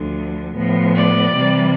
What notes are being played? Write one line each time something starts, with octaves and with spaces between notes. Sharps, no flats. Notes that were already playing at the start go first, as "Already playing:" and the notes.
Already playing: D2 D3 F3
A2 F3 B3
D5
C3 E3 G3